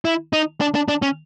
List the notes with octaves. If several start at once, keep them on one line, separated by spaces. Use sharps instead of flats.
E4
D#4
D4
D4
D4
C#4